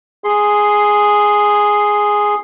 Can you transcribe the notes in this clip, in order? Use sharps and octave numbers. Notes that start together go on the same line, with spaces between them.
G#4 C6